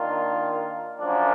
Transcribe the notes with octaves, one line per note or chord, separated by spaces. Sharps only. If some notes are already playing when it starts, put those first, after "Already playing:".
Already playing: D#3 A#3 D4 F4
F#2 F3 A#3 D4